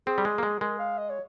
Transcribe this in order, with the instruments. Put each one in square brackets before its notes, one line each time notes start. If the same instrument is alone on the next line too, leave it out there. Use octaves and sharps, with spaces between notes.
[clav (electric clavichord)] C4 [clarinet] G#4
[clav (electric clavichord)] G3
G#3
A#3
G#3
[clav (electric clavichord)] G#3 [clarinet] A#4
[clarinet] F5
D#5
C#5